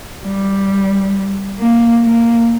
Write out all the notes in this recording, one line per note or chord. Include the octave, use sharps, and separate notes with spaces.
G3
A#3
A#3